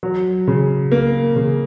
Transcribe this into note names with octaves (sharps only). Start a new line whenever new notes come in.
F#3
C#3
A#3
C#3